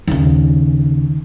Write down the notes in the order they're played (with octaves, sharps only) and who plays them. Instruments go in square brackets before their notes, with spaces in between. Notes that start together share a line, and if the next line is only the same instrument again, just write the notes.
[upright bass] D#2 C#3